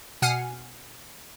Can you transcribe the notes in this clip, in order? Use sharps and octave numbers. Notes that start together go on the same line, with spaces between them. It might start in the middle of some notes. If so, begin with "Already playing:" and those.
B2 F#5 G#5 F6 C7